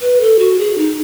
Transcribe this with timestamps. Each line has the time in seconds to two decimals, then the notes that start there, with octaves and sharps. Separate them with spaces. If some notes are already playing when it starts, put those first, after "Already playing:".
0.01 B4
0.21 A4
0.39 F#4
0.59 G#4
0.78 D#4